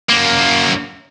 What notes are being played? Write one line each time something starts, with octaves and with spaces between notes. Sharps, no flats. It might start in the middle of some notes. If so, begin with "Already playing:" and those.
F#2 A#3